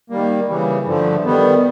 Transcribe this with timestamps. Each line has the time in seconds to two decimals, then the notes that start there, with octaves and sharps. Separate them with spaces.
0.10 D#3 G3 A#3
0.48 C#3 E3 G3
0.85 G2 D3 F3 A3
1.24 D#3 G3 B3